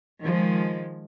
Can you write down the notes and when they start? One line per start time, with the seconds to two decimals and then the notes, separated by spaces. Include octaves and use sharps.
0.23 D#3 F3 G#3